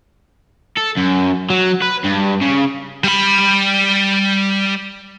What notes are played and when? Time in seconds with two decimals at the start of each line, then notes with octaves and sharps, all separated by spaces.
0.77 A4
0.97 F#2
1.50 F#3
1.82 B4
2.04 G2
2.41 C#3
3.04 G3 B5